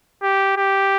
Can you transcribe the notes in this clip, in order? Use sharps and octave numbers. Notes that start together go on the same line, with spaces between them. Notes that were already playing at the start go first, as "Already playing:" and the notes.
G4
G4